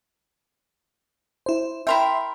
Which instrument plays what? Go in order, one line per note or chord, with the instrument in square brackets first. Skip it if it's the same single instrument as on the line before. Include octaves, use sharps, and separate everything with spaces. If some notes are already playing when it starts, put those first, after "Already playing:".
[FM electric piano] E4 C5
[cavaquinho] E4 A#4 G5 [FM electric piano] E5 C6